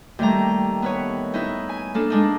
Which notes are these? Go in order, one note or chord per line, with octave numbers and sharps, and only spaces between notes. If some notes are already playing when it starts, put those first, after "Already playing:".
D#2 G3 A3 A#5
B3 B4 C#5
D#4 E4 B4
G#5
A#3 D4 A4
G#3 D4 D#4